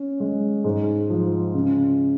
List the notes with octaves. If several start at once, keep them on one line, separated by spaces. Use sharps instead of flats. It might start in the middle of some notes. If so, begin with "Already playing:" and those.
Already playing: C#4
G#3
G#2
F3
C#3